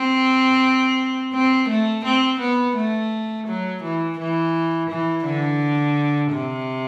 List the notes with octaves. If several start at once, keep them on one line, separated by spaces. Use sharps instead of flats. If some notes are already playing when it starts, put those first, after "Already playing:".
Already playing: C4
C4
A3
C4
B3
A3
F#3
E3
E3
E3
D3
C3